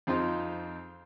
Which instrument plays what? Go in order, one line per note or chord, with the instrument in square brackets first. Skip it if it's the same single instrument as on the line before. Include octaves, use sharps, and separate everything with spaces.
[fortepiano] F2 C4 D#4 F4 C6